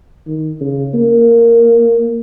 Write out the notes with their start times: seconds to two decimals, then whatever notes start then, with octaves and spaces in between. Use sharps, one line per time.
0.27 D#3
0.61 C#3
0.94 A#3